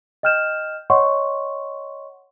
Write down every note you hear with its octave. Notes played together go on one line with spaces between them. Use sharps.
D#5 G5 F6 G6 E7
C#5 D#5 F#5 C6 C#6